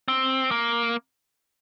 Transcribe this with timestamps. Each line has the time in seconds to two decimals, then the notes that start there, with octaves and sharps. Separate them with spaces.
0.08 C4
0.51 A#3